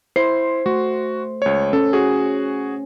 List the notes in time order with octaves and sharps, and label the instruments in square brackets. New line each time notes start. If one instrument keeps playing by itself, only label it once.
[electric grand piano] E4 C7 [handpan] C5
[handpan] A3 [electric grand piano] F#4
[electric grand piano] C#2 C#5
[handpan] C#4 [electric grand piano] A4
[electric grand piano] F#4 G#4